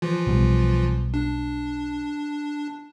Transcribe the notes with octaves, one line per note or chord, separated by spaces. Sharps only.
E3 F3 F4
B1 B2 G3
D4